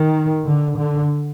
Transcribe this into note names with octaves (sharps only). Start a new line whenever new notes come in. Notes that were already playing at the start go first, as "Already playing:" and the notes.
Already playing: D#3
D3
D3